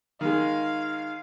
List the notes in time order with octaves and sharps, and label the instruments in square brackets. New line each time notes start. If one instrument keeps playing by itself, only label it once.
[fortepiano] D#3 G#3 [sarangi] F5